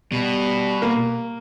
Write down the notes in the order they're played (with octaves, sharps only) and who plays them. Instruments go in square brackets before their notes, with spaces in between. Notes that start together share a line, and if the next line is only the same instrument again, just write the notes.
[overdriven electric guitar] B2 [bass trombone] G3
[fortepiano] A#3